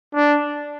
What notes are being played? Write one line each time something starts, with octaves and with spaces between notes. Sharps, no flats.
D4